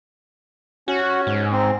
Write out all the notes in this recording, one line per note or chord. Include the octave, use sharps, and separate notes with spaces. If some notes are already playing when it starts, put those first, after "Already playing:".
C#4 F#4
G#2
C4